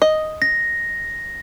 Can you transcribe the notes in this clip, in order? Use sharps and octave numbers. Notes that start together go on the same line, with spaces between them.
D#5
A#6